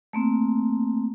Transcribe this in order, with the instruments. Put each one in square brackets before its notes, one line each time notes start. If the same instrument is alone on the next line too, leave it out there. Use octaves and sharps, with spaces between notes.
[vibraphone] A3 A#3 C4